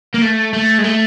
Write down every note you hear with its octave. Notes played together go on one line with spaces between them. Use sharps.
A#3
A3
A3
G#3
A3